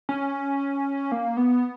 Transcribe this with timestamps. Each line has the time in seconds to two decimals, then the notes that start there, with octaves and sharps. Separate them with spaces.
0.09 C#4
1.12 A#3
1.37 B3